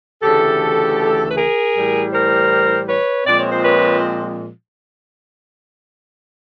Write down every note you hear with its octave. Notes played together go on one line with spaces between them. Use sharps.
D2 C#3 E3 A3 G4 A4
B4
G#4 A#4
A2 E3 G3
A#4 C5
B4 C#5
A#2 F3 G#3 C4 D5
C#5
C5
B4 C#5